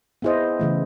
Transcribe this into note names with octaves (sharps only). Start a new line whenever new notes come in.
B3 E4 G#4 C5 D#5
C#3 E3 A3